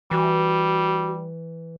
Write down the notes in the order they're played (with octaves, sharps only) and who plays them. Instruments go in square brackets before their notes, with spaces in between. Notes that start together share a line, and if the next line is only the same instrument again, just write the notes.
[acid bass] E3 [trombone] G3 [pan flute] F#4